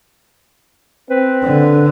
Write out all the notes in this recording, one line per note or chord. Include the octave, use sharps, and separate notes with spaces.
C4 B4
D3